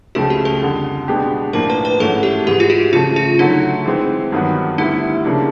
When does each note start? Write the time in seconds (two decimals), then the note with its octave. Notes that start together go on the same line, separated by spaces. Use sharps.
0.15 C#2 C#3 F3 A3 F#4
0.30 G4
0.45 A4
0.61 F2 D3 G3
1.08 B2 G#3 B3 D4 G4
1.53 A2 F3 A#3 D4 A#4
1.70 B4
1.85 B4
2.00 G#2 E3 A3 C#4 F#4 A4
2.23 G4
2.46 G#2 E3 G#3 G4
2.60 F4
2.70 F#4
2.93 C#3 F3 A3 F4
3.16 F4
3.39 D3 F#3 A3 D#4
3.86 E3 G#3 C4
4.32 G2 D#3 F#3 B3
4.78 D2 D3 G3 B3 D#4 E4
5.25 C#3 F3 A#3 D4